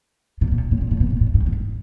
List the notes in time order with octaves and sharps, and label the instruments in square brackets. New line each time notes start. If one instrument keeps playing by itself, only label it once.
[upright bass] A#2
A#2
A2
A#2
A2
B2
A#2
A2
G#2
G#2